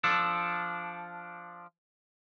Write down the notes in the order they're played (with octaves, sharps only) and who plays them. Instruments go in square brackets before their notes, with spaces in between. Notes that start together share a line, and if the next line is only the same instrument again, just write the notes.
[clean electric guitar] F3 D4 A4